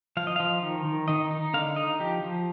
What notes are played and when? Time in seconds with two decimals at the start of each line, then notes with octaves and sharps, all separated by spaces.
0.17 F3 F5
0.27 D#5
0.36 F3 F5
0.62 D#3
0.85 D#3
1.08 D#3 D#5
1.31 D#4
1.54 D3 F5
1.76 D#4 D#5
2.00 F3 G4
2.23 F3